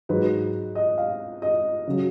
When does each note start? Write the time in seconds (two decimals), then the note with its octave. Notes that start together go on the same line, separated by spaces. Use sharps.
0.09 G#2 F#3 B4
0.75 D#5
0.98 F5
1.42 D#5
1.87 C#3 F#3